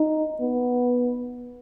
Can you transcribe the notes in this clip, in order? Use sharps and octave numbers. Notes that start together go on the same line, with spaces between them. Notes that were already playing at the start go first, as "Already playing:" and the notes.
Already playing: D#4
B3